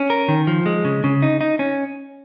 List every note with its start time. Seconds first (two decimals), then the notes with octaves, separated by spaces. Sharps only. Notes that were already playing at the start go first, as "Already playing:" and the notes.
Already playing: C#4
0.10 A#4
0.28 D#3
0.47 F3
0.66 G#3
0.85 C#3
1.04 C#3
1.22 D#4
1.41 D#4
1.59 C#4